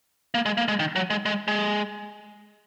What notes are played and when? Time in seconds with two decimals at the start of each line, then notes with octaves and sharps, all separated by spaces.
0.34 A#3
0.46 G#3
0.57 A#3
0.68 G#3
0.79 D#3
0.96 F#3
1.10 G#3
1.26 G#3
1.48 G#3